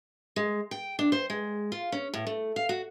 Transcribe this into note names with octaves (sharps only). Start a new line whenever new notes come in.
G#3
G5
D4
C5
G#3
F4
C#4
A2
A3
F5
F#4